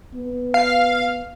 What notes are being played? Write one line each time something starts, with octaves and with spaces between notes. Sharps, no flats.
B3
F5